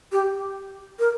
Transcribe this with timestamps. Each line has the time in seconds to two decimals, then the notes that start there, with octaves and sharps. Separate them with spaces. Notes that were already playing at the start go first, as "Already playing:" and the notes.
0.12 G4
0.99 A#4